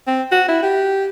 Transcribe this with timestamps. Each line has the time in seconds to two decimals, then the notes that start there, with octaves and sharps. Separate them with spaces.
0.07 C4
0.32 F#4
0.48 E4
0.63 G4